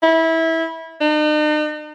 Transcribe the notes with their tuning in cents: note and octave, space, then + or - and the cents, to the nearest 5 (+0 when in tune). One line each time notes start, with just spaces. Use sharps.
E4 -20
D#4 -45